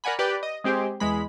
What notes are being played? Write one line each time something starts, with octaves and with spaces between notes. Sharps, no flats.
A#4 D5 F#5 G#5 B5
G4 B4 D5
D#5
G#3 C4 G4 G#4 C5
E2 G#3 B5